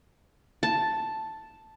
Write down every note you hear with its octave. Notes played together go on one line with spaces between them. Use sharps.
A5